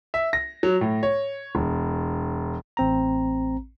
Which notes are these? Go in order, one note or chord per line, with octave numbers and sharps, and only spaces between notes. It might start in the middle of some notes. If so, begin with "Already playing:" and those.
E5
A#6
F#3
A2
C#5
E1
A1 C4 A#5